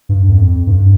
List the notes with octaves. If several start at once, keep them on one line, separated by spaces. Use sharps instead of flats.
G2
F2
G2